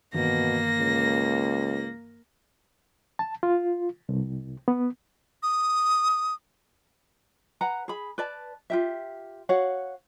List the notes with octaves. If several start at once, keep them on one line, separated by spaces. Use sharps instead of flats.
G2 B2 D#3 E3 A#3 A#6
C#2
A5
F4
C2
B3
D#6
B4 F#5 A#5
G#4 B5
B4 D5 A5
F4 G4 E5
F#4 C#5 F5 F#5